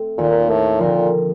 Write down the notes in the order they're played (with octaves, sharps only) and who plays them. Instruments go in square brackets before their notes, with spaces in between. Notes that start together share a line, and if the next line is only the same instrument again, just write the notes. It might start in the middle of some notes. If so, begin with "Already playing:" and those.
Already playing: [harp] A3 C4
[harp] D#2 D#3 A#3 [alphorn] A#2
[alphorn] A2
[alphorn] A#2 [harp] D3 F3 C4 F4 A#4